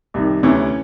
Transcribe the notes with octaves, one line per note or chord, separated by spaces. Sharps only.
C2 C3 D#3
D2 C3 E3 C#4